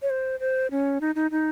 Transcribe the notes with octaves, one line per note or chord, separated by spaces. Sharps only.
C#5
C5
C5
C#4
D#4
D#4
D#4